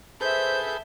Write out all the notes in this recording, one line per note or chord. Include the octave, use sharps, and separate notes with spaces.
G#4 A4 B4 C5 E5 G6